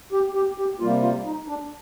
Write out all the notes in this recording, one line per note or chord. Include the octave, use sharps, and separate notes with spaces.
G4
G4
G4
C3 G3 A#3 F4
F4
D#4
D4